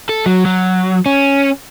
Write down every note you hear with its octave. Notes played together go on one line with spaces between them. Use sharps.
A4
F#3
F#3
C#4